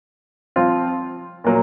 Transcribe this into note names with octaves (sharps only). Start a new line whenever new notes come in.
F3 C4 F4
A#2 F#3 A#3